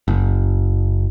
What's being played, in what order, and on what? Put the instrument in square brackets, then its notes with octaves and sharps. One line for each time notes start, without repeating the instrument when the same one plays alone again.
[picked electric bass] F#1